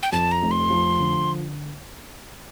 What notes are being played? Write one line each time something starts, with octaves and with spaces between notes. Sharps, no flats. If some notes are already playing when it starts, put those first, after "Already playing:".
G5
F2 A5
A#5
F1
C6
F3
D3